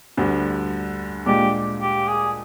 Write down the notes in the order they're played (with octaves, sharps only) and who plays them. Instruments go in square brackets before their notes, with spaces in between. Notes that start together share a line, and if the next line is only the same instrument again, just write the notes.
[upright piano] D2 D3 G3
[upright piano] A#2 G#3 D4 [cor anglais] G4
[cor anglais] G4
G#4